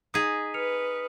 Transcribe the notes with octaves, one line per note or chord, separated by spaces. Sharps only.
D#4 G#4 D#6 B6 D#7
B4 F6 C#7 F7